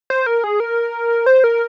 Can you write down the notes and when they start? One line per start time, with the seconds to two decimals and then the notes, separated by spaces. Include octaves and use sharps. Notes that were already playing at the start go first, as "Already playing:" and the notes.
0.10 C5
0.26 A#4
0.44 G#4
0.60 A#4
1.26 C5
1.44 A#4